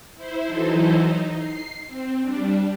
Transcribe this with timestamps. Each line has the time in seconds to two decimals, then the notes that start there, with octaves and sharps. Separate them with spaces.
0.16 E4 C5
0.46 E3 F#3 D#4 E4 A4 C5
1.01 D#4
1.36 C7
1.87 C4
2.22 G3 D4